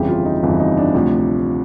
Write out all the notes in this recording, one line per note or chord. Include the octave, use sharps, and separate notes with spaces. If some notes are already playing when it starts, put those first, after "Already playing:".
Already playing: G1 F2 C#3 E3 G4
F4
D#4
G1 F2 C#3 E3
D#4
D4
D2 C3 F3